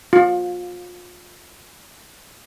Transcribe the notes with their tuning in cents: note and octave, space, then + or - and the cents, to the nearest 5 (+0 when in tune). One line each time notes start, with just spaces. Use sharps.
F4 +30